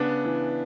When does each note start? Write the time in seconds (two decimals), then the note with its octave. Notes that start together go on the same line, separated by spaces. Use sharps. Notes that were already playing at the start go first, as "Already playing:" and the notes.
Already playing: C#3 B3 D4
0.25 E3